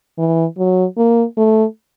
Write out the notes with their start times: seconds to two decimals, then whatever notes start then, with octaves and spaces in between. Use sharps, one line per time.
0.18 E3
0.58 F#3
0.97 A#3
1.37 A3